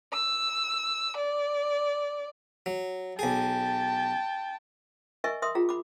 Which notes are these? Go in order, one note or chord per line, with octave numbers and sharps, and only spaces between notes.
E6
D5
F#3
B1 G#4 G5 A5
A#4 D#5 E5 G#5 C#6
A#4 E5 C6 D#6
F4 G#4 A#5
B5 D6